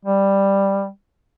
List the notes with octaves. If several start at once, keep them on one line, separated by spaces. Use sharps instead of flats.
G3